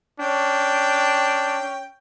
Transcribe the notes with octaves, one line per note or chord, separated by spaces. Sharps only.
C#4 D4 G5